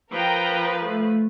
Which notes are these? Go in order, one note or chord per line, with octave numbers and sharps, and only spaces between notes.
F3 A#4 B4 G5 A#5
A3